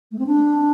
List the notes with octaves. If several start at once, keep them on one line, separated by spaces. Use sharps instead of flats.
A3
C4
D4